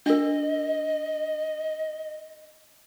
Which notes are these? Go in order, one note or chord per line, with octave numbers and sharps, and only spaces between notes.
D4 A#4 D#5